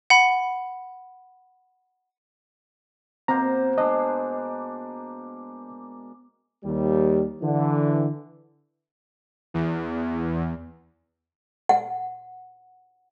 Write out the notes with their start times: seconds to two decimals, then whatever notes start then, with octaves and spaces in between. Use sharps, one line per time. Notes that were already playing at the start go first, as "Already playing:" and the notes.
0.10 F#5 B5
3.28 B2 A#3 C4 C5 A#5
3.78 G#3 D4 D#5
6.64 D#2 G3
7.41 D3 E3
9.54 E2
11.69 F#5